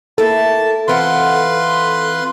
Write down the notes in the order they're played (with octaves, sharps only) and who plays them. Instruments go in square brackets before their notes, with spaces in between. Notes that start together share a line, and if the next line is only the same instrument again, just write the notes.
[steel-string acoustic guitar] A#3 E4 [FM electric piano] A4 [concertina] A5
[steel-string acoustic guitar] E3 C4 F#5 [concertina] F4 B4 C6